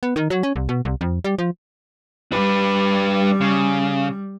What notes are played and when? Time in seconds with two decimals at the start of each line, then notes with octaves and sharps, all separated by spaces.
0.03 B3
0.16 D#3
0.30 F#3
0.43 C#4
0.56 C2
0.69 B2
0.85 C2
1.01 F2
1.24 G3
1.38 F3
2.32 G3 D4 B4
3.41 C#3